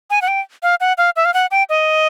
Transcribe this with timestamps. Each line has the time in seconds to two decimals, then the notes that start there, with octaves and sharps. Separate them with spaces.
0.10 G#5
0.22 F#5
0.28 G5
0.63 F5
0.81 F#5
0.98 F5
1.16 E5
1.25 F5
1.34 F#5
1.51 G5
1.69 D#5